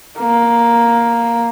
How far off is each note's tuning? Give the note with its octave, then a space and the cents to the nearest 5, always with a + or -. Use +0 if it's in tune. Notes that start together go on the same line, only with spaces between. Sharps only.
A#3 +5